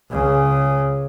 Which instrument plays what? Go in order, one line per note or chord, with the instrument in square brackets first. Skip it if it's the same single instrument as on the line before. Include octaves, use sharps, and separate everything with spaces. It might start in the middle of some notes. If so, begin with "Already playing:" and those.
[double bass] C#2 C#3